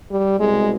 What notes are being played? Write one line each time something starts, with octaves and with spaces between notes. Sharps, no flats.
G3
C2 B2 G#3